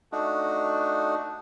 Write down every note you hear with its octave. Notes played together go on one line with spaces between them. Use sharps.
A3 D4 D#4 F#4